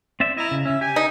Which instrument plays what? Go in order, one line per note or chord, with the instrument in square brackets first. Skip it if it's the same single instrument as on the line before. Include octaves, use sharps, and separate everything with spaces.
[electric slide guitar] C4 D5 E5
[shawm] E4 [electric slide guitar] D#5 A#5
[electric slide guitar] C#3
[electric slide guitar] C#3 C#4 [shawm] E5
[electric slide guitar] G4 [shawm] G#5
[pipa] D#4